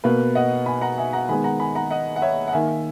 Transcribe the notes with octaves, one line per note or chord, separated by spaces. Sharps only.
B2 A#3 B4
D#5 F#5
G#5 B5
F#5 A#5
E5 G#5
F#5 A#5
D#3 G#3 B3 G#5 B5
F#5 A#5
G#5 B5
F#5 A#5
D#5 F#5
F#5
C#5 E5
F#5
D#3 A#3 E5 G#5